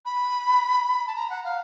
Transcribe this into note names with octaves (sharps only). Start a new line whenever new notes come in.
B5
A5
A#5
F#5
F5